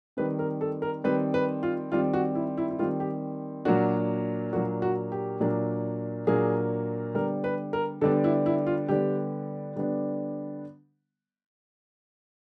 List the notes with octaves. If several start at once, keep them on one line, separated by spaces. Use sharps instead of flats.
D#3 G3 C4 B4
A#4
A4
A#4
D#3 G3 C4 B4
B4
F4
D#3 G3 C4 F4
F#4
E4
E4
E4
D#3 G3 C4 F4
G4
A#2 F#3 A#3 D4 F#4
A#2 F#3 A#3 D4 F#4
F#4
G4
A#2 F#3 A#3 D4
A#2 F#3 A#3 D4 G#4
D3 G3 B3 D4 A#4
B4
A#4
D3 G3 B3 D4 A4
E4
E4
F4
D3 G3 B3 D4 G4
D3 G3 B3 D4